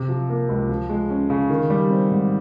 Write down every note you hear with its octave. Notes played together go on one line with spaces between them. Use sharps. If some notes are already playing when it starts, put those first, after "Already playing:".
Already playing: C3
F3
A#3
C#2
F3
G#3
C#4
C#3
D#3
G3
C4
G#2